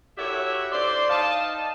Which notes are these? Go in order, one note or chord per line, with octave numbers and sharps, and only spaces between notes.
E4 F#4 G4 A4 C#5 E5
C5 D5 C6
D#4 D#5 F5 A5